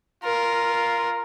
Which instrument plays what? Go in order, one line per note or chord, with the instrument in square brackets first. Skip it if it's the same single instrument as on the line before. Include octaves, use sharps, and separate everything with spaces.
[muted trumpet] F4 [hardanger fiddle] A#4